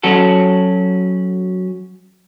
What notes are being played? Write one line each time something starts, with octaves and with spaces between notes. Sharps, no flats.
F#3 C#4 F#4 A4